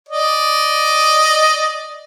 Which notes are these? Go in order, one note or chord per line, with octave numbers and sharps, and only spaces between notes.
D5 D#5